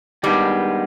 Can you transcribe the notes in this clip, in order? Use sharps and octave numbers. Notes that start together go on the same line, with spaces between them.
G2 D#3 G3 G#3 B3